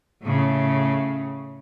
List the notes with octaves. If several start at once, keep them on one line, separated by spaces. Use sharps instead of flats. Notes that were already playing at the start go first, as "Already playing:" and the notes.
A2 C#3